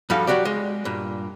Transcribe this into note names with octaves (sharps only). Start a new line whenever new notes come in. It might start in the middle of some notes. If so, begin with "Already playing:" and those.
G2 F3 G3 F#4 A4 F5
F#3 F#4 G4 D5
G#3
G2 A#2